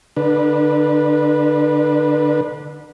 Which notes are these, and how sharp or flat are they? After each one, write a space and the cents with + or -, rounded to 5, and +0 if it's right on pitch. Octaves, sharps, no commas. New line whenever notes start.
D3 +0 D4 +35 B4 -25